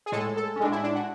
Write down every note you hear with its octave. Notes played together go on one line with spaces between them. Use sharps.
G#4
A2 G#3 A4
A4
C#4
A2 G#3 D4
E4
D4
F#4